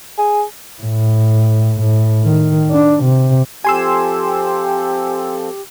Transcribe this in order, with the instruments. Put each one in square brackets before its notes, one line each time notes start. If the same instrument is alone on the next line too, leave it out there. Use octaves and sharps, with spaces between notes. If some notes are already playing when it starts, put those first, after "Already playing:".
[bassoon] G#4
[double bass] A2
A2
D#3
D4
C3
[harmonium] F3 C4 A4 [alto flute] G4 [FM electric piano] G#5 C6 E6